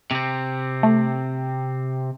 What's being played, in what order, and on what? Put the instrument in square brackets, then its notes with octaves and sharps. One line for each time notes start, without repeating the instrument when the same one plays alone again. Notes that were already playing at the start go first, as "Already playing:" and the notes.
[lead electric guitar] C3 C4
[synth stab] A3